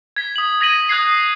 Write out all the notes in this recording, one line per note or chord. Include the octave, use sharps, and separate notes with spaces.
G#6 B6
D#6 F#7
D#6 G#6 A#6 B6 D#7 F#7
D#6 F#6 G#6 C7